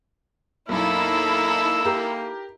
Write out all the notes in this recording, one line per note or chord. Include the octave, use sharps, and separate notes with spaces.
B1 F#2 A#3 D#4 E4 A4 E6
A#3 G4 A#4